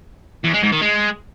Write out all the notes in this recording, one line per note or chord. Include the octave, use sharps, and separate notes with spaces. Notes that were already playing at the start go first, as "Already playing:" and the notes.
E2
G#3
G#2
D#3
G#3